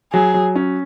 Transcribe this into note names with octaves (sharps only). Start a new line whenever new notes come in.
F#3 G#4
F#3
C#4